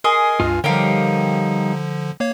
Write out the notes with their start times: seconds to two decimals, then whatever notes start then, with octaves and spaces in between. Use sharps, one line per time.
0.04 G#4 A#4 D#5 C6
0.40 C#2 G2 F4 G#5 F6
0.64 D3 F3 G3 D#4 G4 A#4 C#5 F5
2.20 A#3 C#5 F5